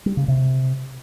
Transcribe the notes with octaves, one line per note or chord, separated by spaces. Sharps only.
G3
C#3
C3